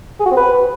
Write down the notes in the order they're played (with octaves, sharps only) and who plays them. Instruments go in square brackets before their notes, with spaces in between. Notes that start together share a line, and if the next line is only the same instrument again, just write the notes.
[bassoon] G#4
F#4
C4
B4